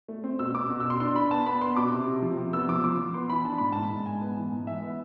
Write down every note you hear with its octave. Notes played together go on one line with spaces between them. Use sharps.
A3
C4
B2 E6
B2 D6
B2
E6
B2 C6
D4 C6
D4 B5
B3 A5
B3 B5
B3 C6
B2 D6
C3
C3
F3
C3
B3 E6
F3 D6
F3 D6
F3
B3 C6
E3 B5
D4 A5
G#2 B5
G#2 A5
G#2
G#2 G#5
B3
E3
G#2
E3 E5
B3